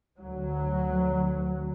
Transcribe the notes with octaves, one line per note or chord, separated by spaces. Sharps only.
D2 F#3